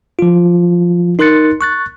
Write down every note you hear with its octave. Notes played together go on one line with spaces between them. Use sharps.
F3 F4
D#4 A#4 C6 F#6 A6 C#7
C#6 F#6 A6